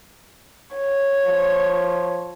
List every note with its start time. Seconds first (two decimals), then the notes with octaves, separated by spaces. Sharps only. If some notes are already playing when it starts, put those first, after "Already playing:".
0.76 C#5
1.26 F3